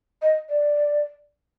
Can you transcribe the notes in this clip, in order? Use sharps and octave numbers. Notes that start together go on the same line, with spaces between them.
D#5
D5